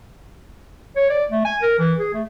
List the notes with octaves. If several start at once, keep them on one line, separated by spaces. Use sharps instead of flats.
C#5
D5
A3
G#5
A#4
E3
G#4
A3